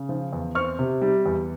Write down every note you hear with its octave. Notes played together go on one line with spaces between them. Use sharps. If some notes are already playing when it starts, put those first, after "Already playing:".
Already playing: C#3
F3
E2
C4 C#6 F6
C3
G3
E2